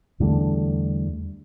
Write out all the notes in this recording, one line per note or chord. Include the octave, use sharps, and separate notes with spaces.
E2 D3 G3 A3